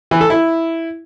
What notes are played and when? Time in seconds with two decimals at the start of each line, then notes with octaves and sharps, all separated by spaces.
0.11 E3
0.21 A4
0.30 E4